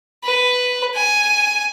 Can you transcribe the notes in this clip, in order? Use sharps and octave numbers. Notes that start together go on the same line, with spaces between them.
B4
G#5